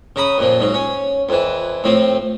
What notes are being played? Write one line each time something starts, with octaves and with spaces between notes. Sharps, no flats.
C#3 A#5 B5 D#6
F2 A#2 F3
G#2 F#3
C#4
F2 E3
A2 F3 C4